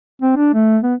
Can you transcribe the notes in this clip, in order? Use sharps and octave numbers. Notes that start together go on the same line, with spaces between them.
C4
D4
A3
B3